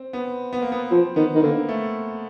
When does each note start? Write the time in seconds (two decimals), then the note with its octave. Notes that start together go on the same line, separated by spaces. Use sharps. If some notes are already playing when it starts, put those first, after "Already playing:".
Already playing: C4
0.13 B3
0.53 B3
0.62 A#3
0.72 B3
0.91 F3 C4
1.16 D#3 B3
1.35 D#3
1.43 D3 A#3
1.69 A3